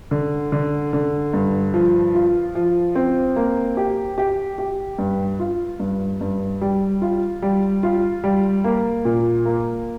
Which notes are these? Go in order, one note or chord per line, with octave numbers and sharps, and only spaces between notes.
D3
D3
D3
G2
F3
F4
F3
C4
A#3
G4
G4
G4
G2
F4
G2
G2
G3
F4
G3
F4
G3
A#3
A#2
A#3